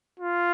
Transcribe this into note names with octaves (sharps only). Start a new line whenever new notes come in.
F4